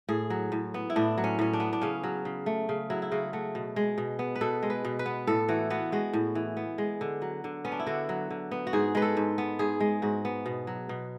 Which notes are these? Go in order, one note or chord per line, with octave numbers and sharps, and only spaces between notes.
A2 G#4
F#3
A2
B3
E4
A2 D4
F#3
C#4
A2 C#4
D4
B3
D4
C#3 C#4
F#3
C#3
A3
C#3
F#3 E4
E4
C#3 F#4
A3 F#4
B2
G#3
B2
B3
B4
B2 A4
G#3
B4
B2
B4
B3
A2 A4
E3 F#4
B3 F#4
G#3 F#4
A2
E3
B3
G#3
D3
F#3
D3
B3 C#4
D4
E4
D3 F#4
F#3
D3
B3
F#4
G#2 G#4
G#3 B4
A4
G#2
B3
G#2 G#4
G#3
G#2 F#4
B3
B2
F#3
B2